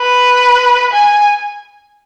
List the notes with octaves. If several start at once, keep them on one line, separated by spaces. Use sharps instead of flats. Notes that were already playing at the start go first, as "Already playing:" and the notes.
Already playing: B4
G#5